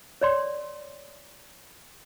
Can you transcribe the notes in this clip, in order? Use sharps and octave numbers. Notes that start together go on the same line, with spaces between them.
C#5 D5 C6